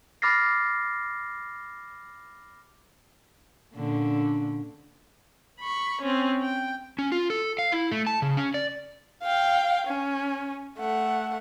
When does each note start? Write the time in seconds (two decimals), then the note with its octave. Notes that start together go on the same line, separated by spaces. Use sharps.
0.22 B5 D6 F6 A6 A#6 C7
3.75 A#2 D3 C#4
5.59 B5 C#6
6.02 C4 C#4
6.42 G5
6.99 C#4
7.12 F4
7.30 A4
7.59 F5
7.72 E4
7.92 A3
8.07 A5
8.22 C#3
8.37 C#4
8.54 D5
9.22 F5 G5
9.87 C#4
10.78 A3 F#5